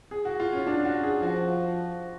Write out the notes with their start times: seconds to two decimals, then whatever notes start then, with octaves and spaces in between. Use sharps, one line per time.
0.11 G#4
0.25 F#4
0.40 F4
0.53 C#4
0.67 D4
0.85 F#4
1.03 G#4
1.22 F3 F#4